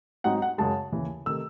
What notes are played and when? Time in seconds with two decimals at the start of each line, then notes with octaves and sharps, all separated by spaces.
0.24 G#2 F#3 C4 D#4 F#5
0.42 F#5
0.58 F#2 C#3 G#3 A5
0.92 D#2 C#3 E3
1.26 C3 D#3 A3 E6